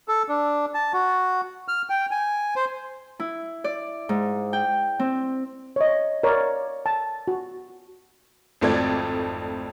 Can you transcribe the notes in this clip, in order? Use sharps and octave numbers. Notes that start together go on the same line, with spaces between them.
A4
D4
A5
F#4
F6
G5
G#5
C5
E4
D5
G#2
G5
C4
C#5 D#5
A#4 C#5 D5
A5
F#4
G#1 F2 A3 C4 D5 G#6